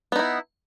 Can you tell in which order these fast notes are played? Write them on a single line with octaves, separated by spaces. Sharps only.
B3 D#4 E4